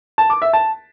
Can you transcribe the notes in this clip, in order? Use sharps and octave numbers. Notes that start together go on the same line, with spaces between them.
A5
D6
E5
A5